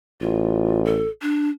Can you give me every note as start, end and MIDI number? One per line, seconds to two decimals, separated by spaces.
0.21 1.04 33
0.21 0.83 65
0.85 1.09 69
1.22 1.50 62